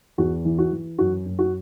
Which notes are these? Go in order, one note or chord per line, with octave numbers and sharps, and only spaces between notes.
E2 F#4
E3
F#4
E3
F#2 F#4
F#2
F#4